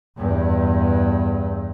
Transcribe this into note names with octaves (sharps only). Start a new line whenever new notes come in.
E2 G2